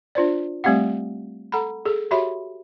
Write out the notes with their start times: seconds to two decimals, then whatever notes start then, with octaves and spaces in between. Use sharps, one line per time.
0.15 D4 F4 C5 D5
0.64 G3 A3 C4 G4 F5 F#5
1.52 A4 F#5 A#5 B5
1.85 G#4 A4
2.11 F#4 G4 C#5 E5 B5